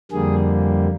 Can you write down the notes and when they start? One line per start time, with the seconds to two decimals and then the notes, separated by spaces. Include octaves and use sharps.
0.11 F2 D3 G3 A#3 G#4